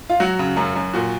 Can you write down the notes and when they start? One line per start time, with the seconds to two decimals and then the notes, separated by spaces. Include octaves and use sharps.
0.09 F4
0.20 F#3 F#4
0.39 C#3
0.57 F#2
0.75 F#2
0.94 A#2 F#4